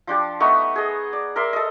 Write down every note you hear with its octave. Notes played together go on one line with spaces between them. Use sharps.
F3 D4 G4
A3 B3 D#4 C#6
G#4 D#5
D5
A#4 D5 E5 C6
A4 D#5